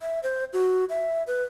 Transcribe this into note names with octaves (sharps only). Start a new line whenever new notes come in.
E5
C5
F#4
E5
B4